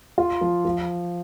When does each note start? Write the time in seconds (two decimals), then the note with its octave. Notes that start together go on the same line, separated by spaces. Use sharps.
0.18 F4
0.41 F3
0.65 F3